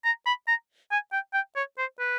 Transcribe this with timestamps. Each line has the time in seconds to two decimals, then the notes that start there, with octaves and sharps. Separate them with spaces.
0.05 A#5
0.26 B5
0.48 A#5
0.92 G#5
1.12 G5
1.34 G5
1.56 C#5
1.78 C5
2.00 B4